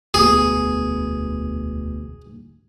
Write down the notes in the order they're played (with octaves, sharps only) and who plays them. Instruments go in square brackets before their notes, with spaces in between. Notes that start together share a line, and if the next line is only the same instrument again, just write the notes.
[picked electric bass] E1 D2 B3 [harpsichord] G#4